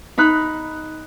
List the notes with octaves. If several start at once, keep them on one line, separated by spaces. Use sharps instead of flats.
D#4 B5 F#6